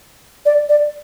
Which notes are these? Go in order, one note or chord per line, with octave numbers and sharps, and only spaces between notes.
D5
D5